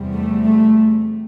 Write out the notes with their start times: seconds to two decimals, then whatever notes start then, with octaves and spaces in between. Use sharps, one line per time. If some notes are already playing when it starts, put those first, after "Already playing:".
Already playing: E2 C3 G3
0.13 A3
0.44 A3